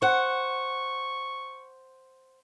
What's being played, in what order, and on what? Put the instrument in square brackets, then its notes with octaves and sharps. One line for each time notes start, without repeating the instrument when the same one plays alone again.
[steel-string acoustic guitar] C5 F#5 [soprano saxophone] C#6